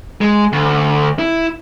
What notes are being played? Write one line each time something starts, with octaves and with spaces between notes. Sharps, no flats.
G#3
D2
E4